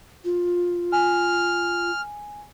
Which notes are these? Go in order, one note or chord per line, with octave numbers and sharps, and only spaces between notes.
F4
G#5 F6